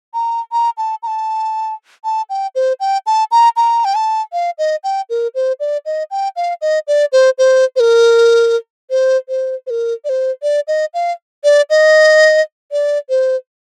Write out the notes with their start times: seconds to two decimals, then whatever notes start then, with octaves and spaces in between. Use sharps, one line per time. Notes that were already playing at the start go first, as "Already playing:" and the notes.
0.14 A#5
0.52 A#5
0.78 A5
1.03 A#5
1.07 A5
2.04 A5
2.30 G5
2.55 C5
2.80 G5
3.06 A5
3.31 A#5
3.56 A#5
3.85 G5
3.95 A5
4.33 F5
4.58 D#5
4.84 G5
5.10 A#4
5.35 C5
5.60 D5
5.86 D#5
6.11 G5
6.36 F5
6.61 D#5
6.87 D5
7.12 C5
7.38 C5
7.76 C5
7.80 A#4
8.90 C5
9.29 C5
9.67 C5
9.70 A#4
10.05 D5
10.09 C5
10.43 D5
10.68 D#5
10.94 F5
11.44 D5
11.70 D#5
12.72 D5
13.09 C5